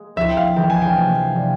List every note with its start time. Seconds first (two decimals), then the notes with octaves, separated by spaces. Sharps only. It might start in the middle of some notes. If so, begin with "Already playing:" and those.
Already playing: G#3 A#3
0.16 F3 C4 E4 E5
0.37 F5
0.56 E3 G#3 E4 G5
0.70 G#5
0.82 G5
0.95 C3 F3 A#3
1.35 C3 G3 A#3 E4